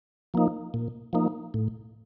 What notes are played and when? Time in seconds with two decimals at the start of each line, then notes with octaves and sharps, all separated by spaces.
0.34 F3 A#3 D#4
0.74 A#2
1.13 F3 A#3 D#4
1.54 A2